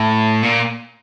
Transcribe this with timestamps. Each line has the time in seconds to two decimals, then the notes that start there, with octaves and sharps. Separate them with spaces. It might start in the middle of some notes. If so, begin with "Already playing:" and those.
Already playing: A2
0.43 A#2